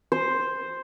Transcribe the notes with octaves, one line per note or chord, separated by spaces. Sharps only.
C5